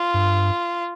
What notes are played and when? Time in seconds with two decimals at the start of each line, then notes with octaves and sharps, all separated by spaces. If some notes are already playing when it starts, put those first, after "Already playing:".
Already playing: F4
0.14 G2